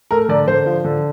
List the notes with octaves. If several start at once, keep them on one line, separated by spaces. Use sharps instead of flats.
A3 A#4
D3 D5
D3 C5
F3
D3